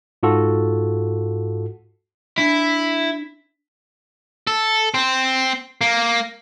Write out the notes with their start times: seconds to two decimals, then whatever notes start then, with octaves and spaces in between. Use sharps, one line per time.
0.23 G#2 F4 F#4 A4
2.38 D4 E4 B6
4.47 A4
4.94 C4
5.81 A#3